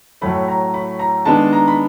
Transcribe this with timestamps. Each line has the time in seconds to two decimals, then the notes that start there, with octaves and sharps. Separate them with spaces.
0.21 A2 F#3 A3 B5
0.48 A#5
0.74 B5
0.99 A#5
1.25 D#3 G#3 B3 D4 A5
1.53 A#5
1.68 B5